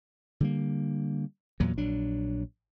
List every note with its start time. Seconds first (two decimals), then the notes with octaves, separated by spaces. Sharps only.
0.40 D3 G3 A#3
1.60 E2 A#2 F#3
1.78 A#1 F#3 D4